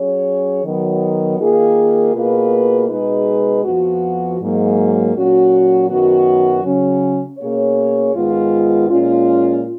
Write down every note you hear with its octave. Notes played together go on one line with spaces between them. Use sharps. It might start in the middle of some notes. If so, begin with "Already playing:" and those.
Already playing: F#3 C#4 G#4 C#5
D#3 F#3 B3
D#3 A#3 F4 G#4
B2 A#3 F4 G#4 B4
B2 G#3 D#4 G#4 B4
F2 F3 B3 F#4
G#2 F#3 A#3
A#2 F#3 C#4 F#4
F#2 D#3 F#3 B3 F#4
C#3 F#3 C#4
B2 A#3 C#4 G#4 C#5
G#2 D#3 G#3 B3 F4
A#2 G#3 C#4 F4